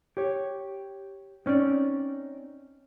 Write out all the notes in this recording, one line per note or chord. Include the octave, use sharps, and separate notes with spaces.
G4 C#5
C4 C#4 D#4 D5